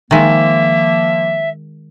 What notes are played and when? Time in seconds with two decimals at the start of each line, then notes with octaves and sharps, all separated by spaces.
0.11 D#3 F3 G#3 A#3 E5